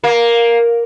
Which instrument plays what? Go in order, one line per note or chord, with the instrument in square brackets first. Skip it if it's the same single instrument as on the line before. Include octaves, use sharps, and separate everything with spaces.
[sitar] A#3